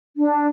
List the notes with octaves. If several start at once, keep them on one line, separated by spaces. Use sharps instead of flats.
D4